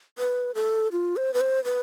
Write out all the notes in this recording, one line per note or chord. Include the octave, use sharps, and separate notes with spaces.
B4
A4
F4
C5
B4
C5
B4